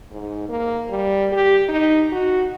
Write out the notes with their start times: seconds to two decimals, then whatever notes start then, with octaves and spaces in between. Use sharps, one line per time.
0.11 G#2
0.49 A#3
0.90 G3
1.32 G4
1.69 D#4
2.12 F#4